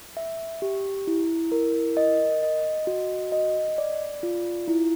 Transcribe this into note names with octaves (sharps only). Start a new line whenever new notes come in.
E5
G4
E4
A#4
D#5
D#5
F#4
D#5
D5
F4
E4